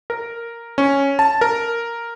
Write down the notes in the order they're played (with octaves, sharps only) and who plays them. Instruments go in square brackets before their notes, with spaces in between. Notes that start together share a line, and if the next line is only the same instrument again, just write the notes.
[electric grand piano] A#4
C#4
A5
A#4